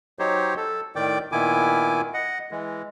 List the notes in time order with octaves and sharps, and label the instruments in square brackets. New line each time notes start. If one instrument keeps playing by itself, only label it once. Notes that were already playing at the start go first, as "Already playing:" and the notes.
[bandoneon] F#3 D#4 G4 C5 C#5
A4
A2 D#3 D5 G5 D6
A#2 D#3 B3 E4 G#5 D6
D#5 F#5
E3 G#3